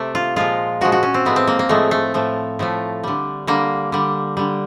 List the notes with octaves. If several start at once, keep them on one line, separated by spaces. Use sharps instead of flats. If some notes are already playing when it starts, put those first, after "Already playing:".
Already playing: C3 A3
F4
A#2 F3 G#3 F4
A#2 F3 G#3 F#4
F#4
C#4
C4
A2 F3 G#3 B3
C4
A#3
A#3
A2 F3 G#3 A3
A3
A2 F3 A3
A2 F3 A3
D3 G3
D3 G3 A#3
D3 G3
D3 G3